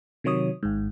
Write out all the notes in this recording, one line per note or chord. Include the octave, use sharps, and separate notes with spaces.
C3 D#3 F#3 C#5 D#6
G#1 G#2